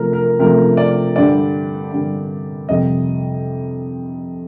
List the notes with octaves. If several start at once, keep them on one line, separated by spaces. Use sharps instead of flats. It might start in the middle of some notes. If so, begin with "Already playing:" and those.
Already playing: C3 F3 A3 A#4
A#4
C3 F3 A3 A#4
D5
G2 D3 G3 D5
G2 D3 G3
F2 C3 G3 D#5